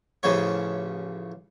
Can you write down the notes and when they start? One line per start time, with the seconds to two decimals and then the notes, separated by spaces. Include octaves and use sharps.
0.23 A1 C#3 F3 C#5